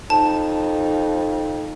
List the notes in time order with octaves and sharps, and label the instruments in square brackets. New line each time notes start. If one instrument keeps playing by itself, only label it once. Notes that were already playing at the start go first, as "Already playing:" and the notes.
[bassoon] F2 [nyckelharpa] D#4 [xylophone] A5